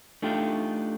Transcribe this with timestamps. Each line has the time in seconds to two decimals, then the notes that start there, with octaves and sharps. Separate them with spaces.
0.22 A3 D4 D#4 F4 G4